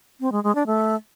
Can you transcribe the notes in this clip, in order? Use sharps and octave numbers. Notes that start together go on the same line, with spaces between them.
C4
G#3
G#3
D4
A3